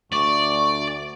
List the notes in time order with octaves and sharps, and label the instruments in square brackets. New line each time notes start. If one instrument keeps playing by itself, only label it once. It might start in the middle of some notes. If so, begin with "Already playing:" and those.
[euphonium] D2 [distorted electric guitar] D5 [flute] C#6